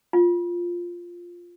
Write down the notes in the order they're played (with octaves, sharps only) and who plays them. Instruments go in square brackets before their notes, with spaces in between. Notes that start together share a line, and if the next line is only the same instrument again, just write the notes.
[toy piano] F4